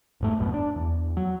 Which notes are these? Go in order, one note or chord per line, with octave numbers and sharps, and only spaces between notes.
D1 G#2 A3
E1 A#1 F#2 B2
D4
E2
F#3